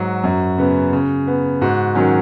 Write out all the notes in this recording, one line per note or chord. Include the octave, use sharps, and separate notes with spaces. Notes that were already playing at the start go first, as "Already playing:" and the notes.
Already playing: G#2 F#3 F#4
F#2
C#3 B3
C#3
B3
G#2 F#4
D#3 F#3 C#4